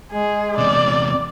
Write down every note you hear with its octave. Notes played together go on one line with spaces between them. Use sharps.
G#3 G#4
E2 C3 D5